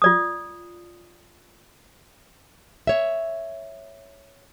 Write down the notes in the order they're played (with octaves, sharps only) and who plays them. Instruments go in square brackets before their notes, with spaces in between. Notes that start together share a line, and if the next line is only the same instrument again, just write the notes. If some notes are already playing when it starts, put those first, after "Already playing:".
[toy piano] F4 D5 D#6
[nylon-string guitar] C#5 E5